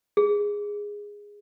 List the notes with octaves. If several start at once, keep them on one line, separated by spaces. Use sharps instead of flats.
G#4